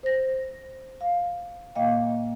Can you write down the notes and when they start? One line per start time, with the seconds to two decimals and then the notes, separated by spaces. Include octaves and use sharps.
0.03 C5 A#6
1.01 F5
1.75 A#2 A#3 D#5 F5 G5